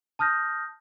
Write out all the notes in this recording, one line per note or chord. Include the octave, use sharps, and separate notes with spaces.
A5 D#6 F6 G6 A#6